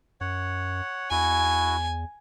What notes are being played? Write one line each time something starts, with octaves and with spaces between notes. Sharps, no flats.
F#2 C#5 F#5
E2 E4 F#4 G#5